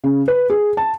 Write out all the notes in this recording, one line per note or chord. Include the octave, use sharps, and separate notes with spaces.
C#3
B4
G#4
A5